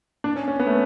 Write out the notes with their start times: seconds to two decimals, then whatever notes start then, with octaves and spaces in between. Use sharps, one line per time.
0.24 D4
0.36 C#4
0.48 C#4
0.59 B3
0.67 A3